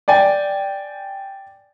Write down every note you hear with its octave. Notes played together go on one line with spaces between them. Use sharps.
D5 G5 G#5